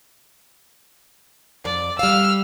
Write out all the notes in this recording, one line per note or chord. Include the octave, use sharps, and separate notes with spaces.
F2 D5
G3 F5 E6 F6